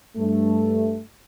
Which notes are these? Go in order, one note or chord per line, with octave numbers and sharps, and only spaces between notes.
G2 A3